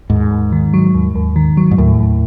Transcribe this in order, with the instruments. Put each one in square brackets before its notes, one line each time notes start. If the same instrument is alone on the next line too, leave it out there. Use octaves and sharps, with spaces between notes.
[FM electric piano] D#2 [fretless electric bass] G#2
[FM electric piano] D#2
D#3
F#3
D#2
D#2
D#3
F#3
[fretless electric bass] G#2
[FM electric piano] D#2 [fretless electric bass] A2
[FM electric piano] D#2